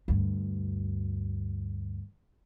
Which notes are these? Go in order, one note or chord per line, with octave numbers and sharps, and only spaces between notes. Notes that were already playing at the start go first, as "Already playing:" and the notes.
D2 G2